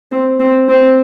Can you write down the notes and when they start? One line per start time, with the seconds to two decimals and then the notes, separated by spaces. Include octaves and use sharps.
0.12 C4
0.40 C4
0.69 C4